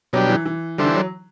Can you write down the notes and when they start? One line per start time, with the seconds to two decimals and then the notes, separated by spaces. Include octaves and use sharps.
0.13 B2 F#3 G3 D4 G4
0.30 E3
0.45 E3
0.78 D3 G3 D4 A4 C5 E5
0.86 E3
0.95 F#3